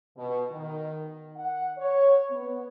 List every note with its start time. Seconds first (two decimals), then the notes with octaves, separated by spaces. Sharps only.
0.16 B2
0.51 D#3
1.36 F#5
1.77 C#5
2.30 B3